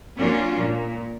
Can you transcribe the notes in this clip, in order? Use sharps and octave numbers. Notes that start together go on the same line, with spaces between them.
F#3 A#3 C#4 D4 F4
A#2